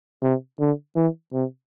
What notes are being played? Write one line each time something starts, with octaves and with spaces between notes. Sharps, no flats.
C3
D3
E3
C3